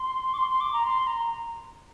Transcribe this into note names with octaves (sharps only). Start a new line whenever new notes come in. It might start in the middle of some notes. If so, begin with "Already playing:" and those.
Already playing: C6
D6
C6
C6
D6
A#5
C6
A#5